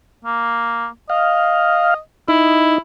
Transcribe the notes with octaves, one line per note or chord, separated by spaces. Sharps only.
A#3
D#5 F5
D#4 E4